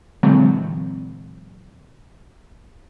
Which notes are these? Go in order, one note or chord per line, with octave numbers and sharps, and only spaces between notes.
A#2 D3 E3 F#3 G#3 C4